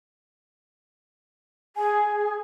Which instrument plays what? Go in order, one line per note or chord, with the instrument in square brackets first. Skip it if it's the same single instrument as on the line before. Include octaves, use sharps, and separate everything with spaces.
[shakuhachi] G#4 [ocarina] G#5